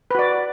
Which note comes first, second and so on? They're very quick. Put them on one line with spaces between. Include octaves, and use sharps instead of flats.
B4 F#4 D5